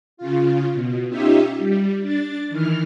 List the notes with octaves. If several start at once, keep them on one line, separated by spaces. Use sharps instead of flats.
C#3 F4
B2
C#4 D#4 F4 G4 E5
G3
D4 A6
D#3 E3 F6